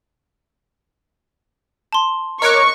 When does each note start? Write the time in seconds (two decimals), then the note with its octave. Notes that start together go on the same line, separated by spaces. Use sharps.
1.93 A5 C6
2.42 A#4 C#5 D#5 C#6 D6 F#6